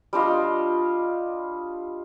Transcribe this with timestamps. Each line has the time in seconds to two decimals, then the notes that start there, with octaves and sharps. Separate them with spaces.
0.13 G3 D4 F4 D#5